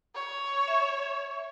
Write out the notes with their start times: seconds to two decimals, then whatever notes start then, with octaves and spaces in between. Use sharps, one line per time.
0.15 C#5
0.68 E5